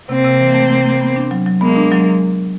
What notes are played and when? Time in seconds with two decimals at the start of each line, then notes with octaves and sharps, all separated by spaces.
0.09 C3 A#3 C4
0.24 C3
0.39 E3
0.54 A3
0.69 C3
0.85 C3
1.01 B3
1.16 D4
1.31 F#3
1.46 F#3
1.61 G#3 A#3 B3
1.76 D4
1.92 F#3